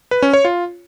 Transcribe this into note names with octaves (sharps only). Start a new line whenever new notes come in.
B4
C#4
C#5
F4